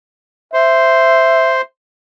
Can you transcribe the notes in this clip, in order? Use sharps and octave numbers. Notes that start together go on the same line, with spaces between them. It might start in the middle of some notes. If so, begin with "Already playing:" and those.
C5 E5